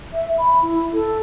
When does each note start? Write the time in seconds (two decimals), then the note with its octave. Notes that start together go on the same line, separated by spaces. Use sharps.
0.13 E5
0.38 B5
0.62 E4
0.93 A4